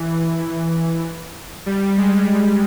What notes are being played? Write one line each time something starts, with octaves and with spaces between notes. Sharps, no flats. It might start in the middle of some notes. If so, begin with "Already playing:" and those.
Already playing: E3
E3
G3
G#3